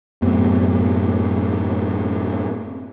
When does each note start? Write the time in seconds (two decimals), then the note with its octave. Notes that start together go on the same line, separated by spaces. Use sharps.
0.22 F#2 A2 C3 B3